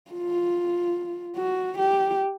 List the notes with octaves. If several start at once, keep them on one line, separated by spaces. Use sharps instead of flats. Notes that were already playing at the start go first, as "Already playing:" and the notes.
F4
F#4
G4